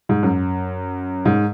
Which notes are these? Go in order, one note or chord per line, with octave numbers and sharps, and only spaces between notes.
G#2
F#2
G#2